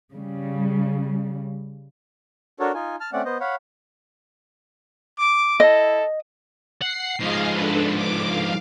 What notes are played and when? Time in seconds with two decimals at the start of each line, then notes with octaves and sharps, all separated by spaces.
0.12 C#3 G3
2.60 D4 F#4 A4 A#4 C#5
2.74 D#4 F4 G#5
3.00 A5 F6
3.13 A3 C4 C#4 D5 F#5
3.25 B3 C5 D#5
3.40 C#5 F5 F#5 B5
5.19 D6
5.60 E4 A4 D#5
6.82 F#5 C7
7.20 G#2 F3 G#4 D#5 F5
7.50 D4 A4 B4
7.96 D6
8.27 F5